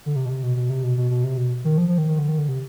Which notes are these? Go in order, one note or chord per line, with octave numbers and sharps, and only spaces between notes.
D3
C3
B2
C3
B2
B2
C3
B2
B2
B2
C3
B2
D#3
F3
F3
D#3
D#3
D3
D#3
D3
C3